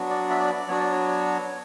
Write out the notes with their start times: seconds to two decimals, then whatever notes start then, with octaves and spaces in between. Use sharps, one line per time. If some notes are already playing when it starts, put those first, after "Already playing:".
Already playing: F#3 B3 D4 F#4
0.10 D5
0.30 E5
0.40 D5
0.68 F#3 B3 D4 F#4 C#5
0.80 D5
0.92 C#5